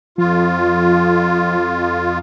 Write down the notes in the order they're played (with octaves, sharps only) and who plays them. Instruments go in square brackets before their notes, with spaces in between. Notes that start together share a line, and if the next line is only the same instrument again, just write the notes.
[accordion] F2 F4 [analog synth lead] F3